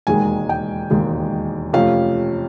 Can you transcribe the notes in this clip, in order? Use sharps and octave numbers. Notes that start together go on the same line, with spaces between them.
E1 D#2 D#3 G#3 G#5
G5
E1 D#2 D#3 G#3
F2 C3 F3 A3 C#4 F5